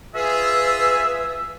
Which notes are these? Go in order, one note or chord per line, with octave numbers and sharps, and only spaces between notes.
F4 G#4 B4 E5 E6